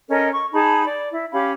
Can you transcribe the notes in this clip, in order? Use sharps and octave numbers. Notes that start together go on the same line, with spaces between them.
C#4 A4 A#4 D#5
C#6
D#4 G#4 A5 B5
D5
E4
C#4 G4 F5 B5